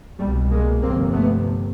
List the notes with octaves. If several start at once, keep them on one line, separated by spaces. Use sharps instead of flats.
C2 B2 G3 A3
G#3 A#3
G1 F2 C3 A#3 C4
A3 B3